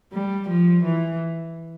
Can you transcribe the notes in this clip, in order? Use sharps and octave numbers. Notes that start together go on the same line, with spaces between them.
G3
F3
E3